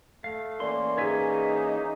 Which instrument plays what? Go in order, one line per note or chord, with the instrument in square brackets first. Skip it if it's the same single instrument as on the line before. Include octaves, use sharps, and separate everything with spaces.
[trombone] A3 [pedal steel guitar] F5
[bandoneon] E3 A#3 C#4 [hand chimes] A#4 D5 [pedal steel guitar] C6
[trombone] D#4 [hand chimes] G#4 B4 [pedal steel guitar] C#5 E5 G#5